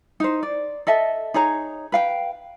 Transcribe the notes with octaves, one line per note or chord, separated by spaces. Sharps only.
D#4 C5
D5
A4 D#5 E5 A5
D#4 G#4 C#5 A#5
B4 F5 G5